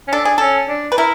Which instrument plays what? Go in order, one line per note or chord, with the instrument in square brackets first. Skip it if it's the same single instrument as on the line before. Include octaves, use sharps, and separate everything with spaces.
[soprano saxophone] C#4
[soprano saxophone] D4 [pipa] A4
[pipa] G#4
[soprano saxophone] C#4 [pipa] A4
[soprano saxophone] D4
[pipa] B4
[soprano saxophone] E4 [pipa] A#4